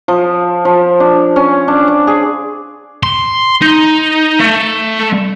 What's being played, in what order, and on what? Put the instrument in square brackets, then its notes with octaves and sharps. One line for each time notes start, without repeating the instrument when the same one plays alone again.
[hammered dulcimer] F3
F3
D4
C#4
D4
D5
G#4
[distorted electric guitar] C6
D#4
A3